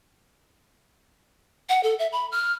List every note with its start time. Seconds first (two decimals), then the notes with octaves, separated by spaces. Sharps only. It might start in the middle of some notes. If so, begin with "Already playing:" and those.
1.69 F#5
1.83 A4
1.99 E5
2.12 B5
2.32 F6